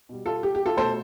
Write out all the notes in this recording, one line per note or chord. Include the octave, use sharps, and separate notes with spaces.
B2 G3
F4 A4
G4
G4
F4 A4
B2 A3 A4 C5